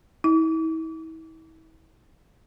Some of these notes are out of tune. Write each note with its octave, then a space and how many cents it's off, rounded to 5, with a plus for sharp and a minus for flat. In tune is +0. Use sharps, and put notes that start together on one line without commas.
E4 -40